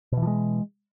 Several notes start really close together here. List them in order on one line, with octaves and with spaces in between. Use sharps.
B2 E3 F3 G#3